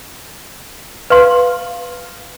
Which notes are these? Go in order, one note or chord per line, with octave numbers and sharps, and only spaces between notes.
B4 F5 C6